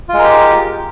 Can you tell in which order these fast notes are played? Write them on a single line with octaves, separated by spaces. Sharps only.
F4 G#3 A#4 G4